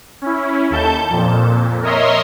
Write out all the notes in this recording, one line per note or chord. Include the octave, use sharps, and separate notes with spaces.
C#4 E4
D#2 A4 A5 G6
F2 A#2
A#4 C#5 D#5 E5 A#5 C6